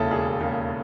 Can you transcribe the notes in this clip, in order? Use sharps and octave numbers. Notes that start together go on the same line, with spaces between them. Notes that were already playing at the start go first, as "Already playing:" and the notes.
Already playing: E1 D#2 C#3 E4 A4
E1 G#4
D#2 C#3